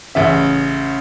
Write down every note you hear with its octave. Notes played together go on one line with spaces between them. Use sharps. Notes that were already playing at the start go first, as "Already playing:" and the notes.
A1 C#3 E5